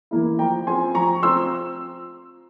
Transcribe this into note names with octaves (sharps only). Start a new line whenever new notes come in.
E3 A#3 E4
F3 G5 A#5
C4 F4 G#5 C6
F3 A#5 C#6
C4 F4 C6 E6